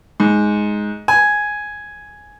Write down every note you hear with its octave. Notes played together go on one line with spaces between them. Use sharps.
G#2
G#5